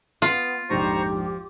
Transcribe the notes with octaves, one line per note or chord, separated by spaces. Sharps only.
B3 F4
A#1 F2 G#2 G4 C5 A#5 C#6
F3